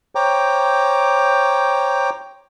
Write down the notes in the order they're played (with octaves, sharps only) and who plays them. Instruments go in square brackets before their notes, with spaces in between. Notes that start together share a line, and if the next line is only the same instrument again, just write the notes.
[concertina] C5 C#5 G5 A#5 D6